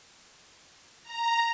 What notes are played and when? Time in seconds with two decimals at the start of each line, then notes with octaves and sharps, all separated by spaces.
1.03 A#5